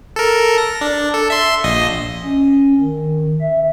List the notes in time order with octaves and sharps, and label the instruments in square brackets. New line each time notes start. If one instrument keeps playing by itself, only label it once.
[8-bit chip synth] A4 A#4
A#6
D4
A4
E5 C6
A#1 D#5
[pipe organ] C#4
D#3
E5